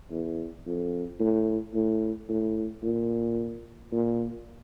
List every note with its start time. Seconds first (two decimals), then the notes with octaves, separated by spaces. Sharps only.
0.11 E2
0.66 F2
1.20 A2
1.74 A2
2.29 A2
2.83 A#2
3.92 A#2